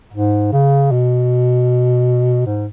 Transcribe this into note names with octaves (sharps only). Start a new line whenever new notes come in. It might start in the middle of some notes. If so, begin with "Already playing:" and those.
G#2
C#3
B2
G#2